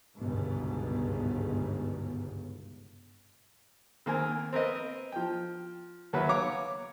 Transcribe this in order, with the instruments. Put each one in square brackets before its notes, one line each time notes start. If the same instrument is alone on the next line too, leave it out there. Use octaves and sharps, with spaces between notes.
[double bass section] G1 C#2 G#2 B2
[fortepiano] D#3 A#3 C4 G#5
C4 A#4 B4 D#5
F3 G5
D#2 F#3 F#4 B4 E5 B5
C#5 F5 A#5 D6